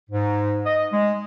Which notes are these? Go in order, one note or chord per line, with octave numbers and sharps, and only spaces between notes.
G#2
D#5
G#3